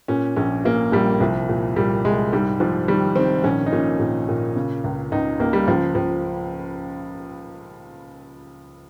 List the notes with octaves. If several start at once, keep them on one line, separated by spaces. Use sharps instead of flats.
A#2 C#4
A#1 C#4
A#2 A#3
A#1 G3
C2 F3
A#2
A#2 G3
C2 G#3
G#2 G3
G#2 F3
D#3 G3
D#3 C4
A#1 C#4
D#4
A#2 C#4
A#2
A#2
C#3
C#2
C#2 D#4
C#2 A#3
G3
C#2 F3
C#2 F3